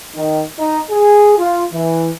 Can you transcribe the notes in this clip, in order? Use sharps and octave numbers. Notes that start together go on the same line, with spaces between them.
D#3
D#4
G#4
F4
E3